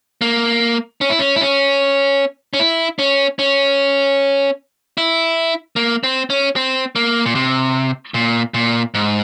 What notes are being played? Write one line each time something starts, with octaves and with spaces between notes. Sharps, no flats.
A#3
C#4
E4
C#4
E4
C#4
C#4
E4
C#4
C#4
E4
A#3
C4
C#4
C4
A#3
A#2
C3
A#2
A#2
G#2